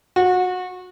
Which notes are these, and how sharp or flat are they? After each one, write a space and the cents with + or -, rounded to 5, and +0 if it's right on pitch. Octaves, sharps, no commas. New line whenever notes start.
F#4 -25